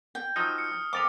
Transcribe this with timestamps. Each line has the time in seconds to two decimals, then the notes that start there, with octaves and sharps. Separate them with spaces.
0.15 G5
0.36 F3 F#3 D#4 D#6 F6
0.58 C#7
0.93 F2 A#4 B4 D6 D#6 F6 A6 F7